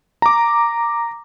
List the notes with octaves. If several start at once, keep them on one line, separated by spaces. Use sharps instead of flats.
A#5 D6